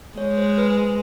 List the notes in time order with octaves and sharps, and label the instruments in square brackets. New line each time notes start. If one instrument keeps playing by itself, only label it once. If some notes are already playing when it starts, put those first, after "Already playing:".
[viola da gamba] G#3 [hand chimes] C#5
[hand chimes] C5
B4